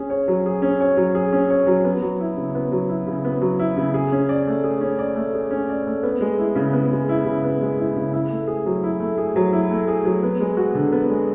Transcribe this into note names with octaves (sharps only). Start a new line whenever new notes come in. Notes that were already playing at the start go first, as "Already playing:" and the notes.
Already playing: C#4 G#4
C#5
F#3
G#4
C#4
C#5
F#3
G#4
C#4
C#5
F#3
B3
F#3
E4
C#3
B3
F#3
E4
C#3
B3
F#3
E4
C#3
G#4
C#4
D5
A3
G#4
C#4
D5
A3
G#4
C#4
D5
A3
B3
G#3
E4
C#3
B3
G#3
E4
C#3
B3
G#3
E4
C#3
E4
A3
G#4
F#3
E4
A3
G#4
F#3
E4
A3
G#4
F#3
B3
G#3
F#4
D3
B3
G#3